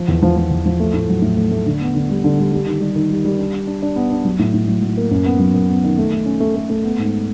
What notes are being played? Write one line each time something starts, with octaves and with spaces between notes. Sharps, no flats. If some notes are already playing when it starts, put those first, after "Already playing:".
Already playing: F3
E2
F3
F3
E2
F3
A3
A2
F#3
A2
A3
A3
D3
B3
D3
G3
D3
G3
G3
D#3
G3
D#3
G3
G3
D4
D4
D4
D4
B3
D4
F#3
A2
A2
F#3
F#3
A#3
F#2
B3
F#3
F#2
B3
D#3
A3
A3
C#4
A3
A3
A3
B3
G#2